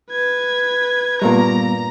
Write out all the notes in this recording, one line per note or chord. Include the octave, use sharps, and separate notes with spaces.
B4 G#6
G2 A#2 G3 A#3 B3 A#5